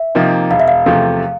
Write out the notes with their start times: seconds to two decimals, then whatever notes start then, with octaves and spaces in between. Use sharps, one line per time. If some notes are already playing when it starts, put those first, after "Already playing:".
Already playing: E5
0.15 C3 F3 A#3 D#4
0.51 E1 F5
0.60 E5
0.68 F5
0.86 E2 C3 F3 A3